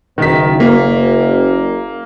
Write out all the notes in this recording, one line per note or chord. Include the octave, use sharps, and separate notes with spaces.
F#1 D#3 B6
A#3